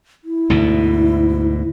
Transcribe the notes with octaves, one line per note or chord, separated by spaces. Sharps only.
E4
D2 G#2 B2